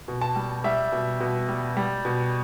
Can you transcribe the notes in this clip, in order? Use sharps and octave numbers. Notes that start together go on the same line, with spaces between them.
B2
A5
G3
G3 E5
B2
B2
G3
G3
B2